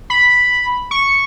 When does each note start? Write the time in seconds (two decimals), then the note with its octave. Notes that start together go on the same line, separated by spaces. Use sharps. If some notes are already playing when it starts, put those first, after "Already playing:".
0.10 B5
0.91 C#6